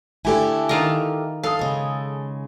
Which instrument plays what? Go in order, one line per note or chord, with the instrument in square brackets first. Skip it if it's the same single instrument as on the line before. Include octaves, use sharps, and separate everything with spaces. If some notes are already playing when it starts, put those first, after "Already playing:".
[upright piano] D3 A3 G#5 [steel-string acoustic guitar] E4 G4 A4
[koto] D#3 F4 A#4
[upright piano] A4 D#6 [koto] F5
[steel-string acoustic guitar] C#3 G#3